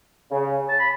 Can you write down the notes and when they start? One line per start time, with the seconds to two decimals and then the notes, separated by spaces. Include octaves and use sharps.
0.31 C#3
0.69 A5
0.79 B5